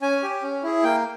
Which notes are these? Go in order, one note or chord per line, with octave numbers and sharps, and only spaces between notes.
C#4 G#5
G4
C#4
E4 G#4
A#3 G5